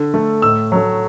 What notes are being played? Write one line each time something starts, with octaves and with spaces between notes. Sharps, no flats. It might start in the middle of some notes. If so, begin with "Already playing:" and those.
Already playing: D3
A3
A2 E6
F#3 A3